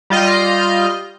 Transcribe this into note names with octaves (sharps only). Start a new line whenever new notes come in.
G3 F4 D#5 F6 G6